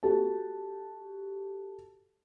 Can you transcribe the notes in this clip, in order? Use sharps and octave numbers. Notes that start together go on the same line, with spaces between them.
F#4 G4 A4 A5